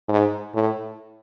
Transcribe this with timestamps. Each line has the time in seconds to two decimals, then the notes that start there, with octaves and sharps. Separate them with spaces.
0.08 G#2
0.55 A2